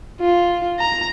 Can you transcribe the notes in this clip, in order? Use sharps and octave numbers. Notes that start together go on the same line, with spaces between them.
F4
A#5